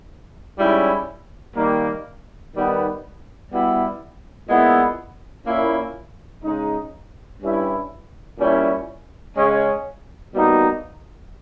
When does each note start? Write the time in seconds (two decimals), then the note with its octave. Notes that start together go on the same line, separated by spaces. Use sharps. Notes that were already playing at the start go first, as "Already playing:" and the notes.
0.59 G#2 G3 C#4 E4
1.56 D#3 G3 A#3
2.54 D#3 G3 B3 D#4
3.52 B2 G3 B3 E4
4.49 A#2 G#3 B3 E4
5.47 A#2 A#3 C#4 E4
6.44 C#3 G#3 D#4
7.42 G2 G3 C#4 E4
8.39 A#2 G3 C#4 E4
9.37 C#3 G#3 C#4
10.35 B2 G3 A#3 D#4